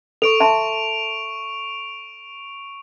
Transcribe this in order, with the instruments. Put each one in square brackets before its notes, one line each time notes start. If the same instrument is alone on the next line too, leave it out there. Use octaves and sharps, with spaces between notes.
[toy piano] A4 [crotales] C#6 D7 F7
[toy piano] E5 A5 C6